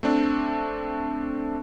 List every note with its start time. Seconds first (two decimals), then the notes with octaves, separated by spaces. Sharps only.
0.03 A3 C4 D4